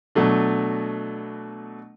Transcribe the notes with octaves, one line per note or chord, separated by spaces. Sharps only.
B2 F#3 A3 D4